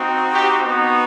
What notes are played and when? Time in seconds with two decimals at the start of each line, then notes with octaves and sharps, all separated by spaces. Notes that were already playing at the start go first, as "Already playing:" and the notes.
Already playing: C4 D#4 F#4
0.32 G4
0.62 B3 D#4 F#4